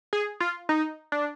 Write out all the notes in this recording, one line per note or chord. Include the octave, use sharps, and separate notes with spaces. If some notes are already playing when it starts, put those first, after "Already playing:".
G#4
F4
D#4
D4